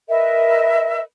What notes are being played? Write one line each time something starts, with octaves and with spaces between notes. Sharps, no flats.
A#4 B4 D#5 E5